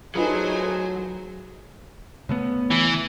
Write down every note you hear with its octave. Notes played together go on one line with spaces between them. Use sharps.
F#3 A3 D#4 F4 G#4 B4 C5 G#5
C#3 A3 B3
E3